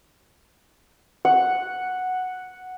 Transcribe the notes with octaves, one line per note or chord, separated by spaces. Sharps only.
F#5